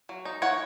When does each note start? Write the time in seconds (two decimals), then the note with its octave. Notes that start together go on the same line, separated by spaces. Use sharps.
0.09 F#3
0.25 D#4
0.42 D#4 C#5 F#5